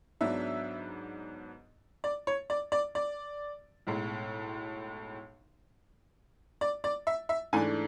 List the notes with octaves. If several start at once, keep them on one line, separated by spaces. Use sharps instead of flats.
G#2 F#3 B3 D4 E5
D5
C#5
D5
D5
D5
B1 A2 G#3
D5
D5
E5
E5
G#2 E3 A3 D4 G#5